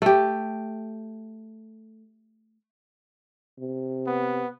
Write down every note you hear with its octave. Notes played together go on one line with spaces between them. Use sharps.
A3 G4
C3
B3